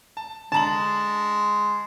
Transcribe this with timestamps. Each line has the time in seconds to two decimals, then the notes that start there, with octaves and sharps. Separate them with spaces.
0.17 A5
0.52 D3 G#3 A5 A#5 F#7